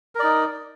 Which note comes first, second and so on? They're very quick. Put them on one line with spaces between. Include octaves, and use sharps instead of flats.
A#4 D5 D#4